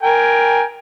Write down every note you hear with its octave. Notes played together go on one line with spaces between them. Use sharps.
A#4 G5 G#5